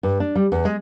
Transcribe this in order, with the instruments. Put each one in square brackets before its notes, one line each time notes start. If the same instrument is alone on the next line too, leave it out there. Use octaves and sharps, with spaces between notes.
[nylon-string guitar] G2
D4
G3
E2
G#3